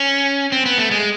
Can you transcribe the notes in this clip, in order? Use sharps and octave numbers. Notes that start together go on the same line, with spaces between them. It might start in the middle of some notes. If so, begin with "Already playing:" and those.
Already playing: C#4
C4
B3
A3
G#3